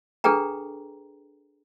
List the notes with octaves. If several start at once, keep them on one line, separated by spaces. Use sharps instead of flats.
D4 G#4 A4 B4 G5 A#5